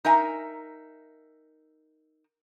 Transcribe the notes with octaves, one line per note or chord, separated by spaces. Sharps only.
D#4 A#4 E5 G#5